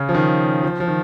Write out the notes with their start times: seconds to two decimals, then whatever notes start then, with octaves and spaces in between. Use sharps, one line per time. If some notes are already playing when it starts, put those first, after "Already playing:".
Already playing: C#3 C#4
0.09 F3
0.15 D#3
0.63 F3
0.80 F3
0.88 D#3